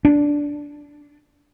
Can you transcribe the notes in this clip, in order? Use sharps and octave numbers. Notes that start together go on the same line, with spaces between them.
D4